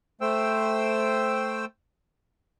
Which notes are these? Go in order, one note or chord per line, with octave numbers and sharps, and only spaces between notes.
A3 C5 G5 E6